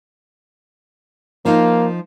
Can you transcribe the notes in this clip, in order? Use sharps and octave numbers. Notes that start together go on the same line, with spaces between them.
F3 A#3 D#4